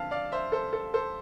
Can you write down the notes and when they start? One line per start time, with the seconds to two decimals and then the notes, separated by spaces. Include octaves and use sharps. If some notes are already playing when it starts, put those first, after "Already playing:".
Already playing: F2 D3 C4 F5 A5
0.11 D5 F5
0.32 C5 E5
0.52 A4 C5
0.73 A4
0.94 A4 C5